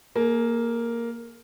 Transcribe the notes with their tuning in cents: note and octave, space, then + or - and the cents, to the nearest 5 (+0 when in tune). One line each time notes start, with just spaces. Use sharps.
A#3 +0 G#4 +40